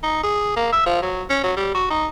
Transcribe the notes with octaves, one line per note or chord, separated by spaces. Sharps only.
D#4
G#4
A#3
E5
F3
F#3
C#4
F#3
G3
F#4
D#4